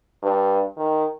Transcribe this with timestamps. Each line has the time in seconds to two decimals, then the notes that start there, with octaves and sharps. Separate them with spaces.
0.23 G2
0.77 D#3